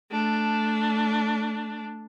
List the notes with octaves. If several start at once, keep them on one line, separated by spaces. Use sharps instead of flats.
A3 D4